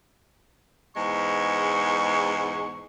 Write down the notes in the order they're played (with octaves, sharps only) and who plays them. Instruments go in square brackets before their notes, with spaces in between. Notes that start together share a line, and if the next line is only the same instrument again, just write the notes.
[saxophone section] E2 G#2 G#3 [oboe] C#6